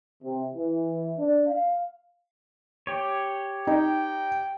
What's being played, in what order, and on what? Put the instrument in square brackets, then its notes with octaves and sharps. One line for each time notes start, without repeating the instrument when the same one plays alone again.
[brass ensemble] C3
E3
D4
F5
[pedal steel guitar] G4 C#5
[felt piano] D#4 [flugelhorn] G5